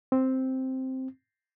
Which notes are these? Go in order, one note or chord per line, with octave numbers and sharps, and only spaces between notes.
C4